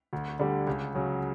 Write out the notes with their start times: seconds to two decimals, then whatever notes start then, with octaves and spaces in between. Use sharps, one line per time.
0.13 D2
0.40 D3 G3
0.67 C#2
0.95 C#3 F#3